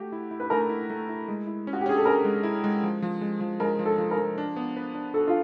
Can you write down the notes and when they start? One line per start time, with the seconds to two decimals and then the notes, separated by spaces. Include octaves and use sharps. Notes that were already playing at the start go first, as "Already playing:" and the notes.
Already playing: A3 F#4 G4
0.12 E4
0.31 E4
0.40 B4
0.50 A3 A#4
0.69 E4
0.90 A3
1.09 E4
1.28 G#3
1.47 E4
1.67 C#4
1.73 F#4
1.81 G4
1.86 C#4 G#4
1.97 A4
2.06 C#4 A#4
2.25 G#3
2.43 E4
2.64 G#3
2.83 F3
3.02 F3
3.21 G#3
3.41 F3
3.60 G#3 A#4
3.79 F3
3.86 A4
3.98 F3
4.11 A#4
4.18 F3
4.38 D4
4.56 B3
4.76 B4
4.95 D4
5.14 F#4 A4
5.27 F4